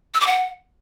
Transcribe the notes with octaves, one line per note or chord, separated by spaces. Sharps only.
E6
D6
F#5